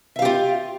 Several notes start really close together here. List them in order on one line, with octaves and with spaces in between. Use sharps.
E5 F5 G4 F4